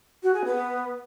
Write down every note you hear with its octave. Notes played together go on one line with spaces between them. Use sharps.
F#4
G#4
B3